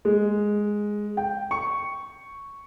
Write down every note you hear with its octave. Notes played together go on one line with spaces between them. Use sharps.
G#3
G5
C#6